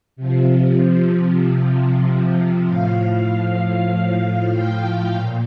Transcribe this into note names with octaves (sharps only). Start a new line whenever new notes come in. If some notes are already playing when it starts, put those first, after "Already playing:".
C3 F3
A2 F3 F5
G5
A#2